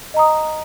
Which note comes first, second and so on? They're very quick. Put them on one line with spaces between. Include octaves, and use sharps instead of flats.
D#5 A#5 D#6